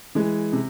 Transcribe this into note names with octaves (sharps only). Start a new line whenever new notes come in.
E3 G#3
C3